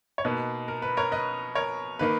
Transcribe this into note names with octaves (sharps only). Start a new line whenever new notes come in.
C#5
B2 A#3 D#4 B4
A#4
B4
A#4 C#5
B4 D#5
A#4 C#5
D#3 A#3 D#4 B4